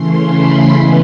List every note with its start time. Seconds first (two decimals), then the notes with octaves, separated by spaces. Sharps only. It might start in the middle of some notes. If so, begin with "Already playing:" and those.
Already playing: C#3 E3 A3 C#4 C6
0.27 B5
0.70 C#3 E3 G#3 B3